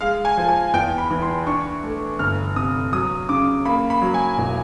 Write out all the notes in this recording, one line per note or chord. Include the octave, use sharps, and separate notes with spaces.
G#3 F5
G#5
F3
G#5
E2 G5
B5
E3
C6
D4 C#6
A3
G1 F6
C3 D#6
F#3 D#6
C#3 D6
A#3 B5
B5
F#3
G#5
E1